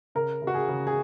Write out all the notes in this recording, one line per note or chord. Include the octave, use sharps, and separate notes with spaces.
C#3 A#4
C#3
F#4
G#4
C#3
G#4